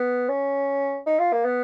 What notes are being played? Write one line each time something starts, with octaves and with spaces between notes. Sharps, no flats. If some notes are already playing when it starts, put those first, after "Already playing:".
Already playing: B3
C#4
D#4
F4
A#3
B3